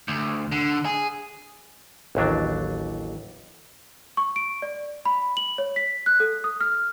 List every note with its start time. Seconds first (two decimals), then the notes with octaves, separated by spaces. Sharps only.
0.08 D2
0.52 D3
0.85 G#4
2.15 A1 D#2 F#3 D4
4.17 C#6
4.36 D7
4.62 D5
5.05 B5
5.37 F#7
5.58 C#5
5.76 B6
6.06 F#6
6.20 A4
6.44 D#6
6.61 F6